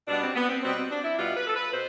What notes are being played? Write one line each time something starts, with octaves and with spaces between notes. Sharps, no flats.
B2 G3 B3 D4
C4
B3
C4
B2 G3 B3 C4
C4
D4
E4
B2 G3 B3 F4
B4
A4
B4
B2 C5